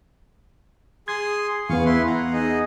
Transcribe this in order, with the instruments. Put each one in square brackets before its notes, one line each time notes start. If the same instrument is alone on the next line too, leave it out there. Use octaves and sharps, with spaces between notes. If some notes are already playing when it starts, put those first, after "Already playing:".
[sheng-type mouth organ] G#4 C6 D#6 [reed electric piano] G#6
[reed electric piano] E2 B3 [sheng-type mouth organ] G#4 F5 C#6
[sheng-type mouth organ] E4 B4 C6
F#5 A#5
D#4 G#4 D#5